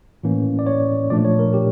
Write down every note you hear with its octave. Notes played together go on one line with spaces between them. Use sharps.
A2 E3 A#3 C#4
D5
C#5
A#2 F3 A3 D4 D5
C#5
A#4
G4